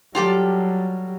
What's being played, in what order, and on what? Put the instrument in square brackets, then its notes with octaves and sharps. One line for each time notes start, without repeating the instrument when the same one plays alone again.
[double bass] F#3 G3 [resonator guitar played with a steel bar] F4 G4 A4